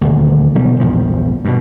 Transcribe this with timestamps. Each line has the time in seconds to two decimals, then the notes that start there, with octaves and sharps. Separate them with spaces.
0.01 D#1 D2
0.55 E1 B2 F#3 G3
0.80 A#1 E2 G2 F3
1.45 G2 B2